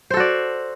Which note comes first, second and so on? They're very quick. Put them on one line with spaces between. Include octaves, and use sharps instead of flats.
C5 A4 F#4 D5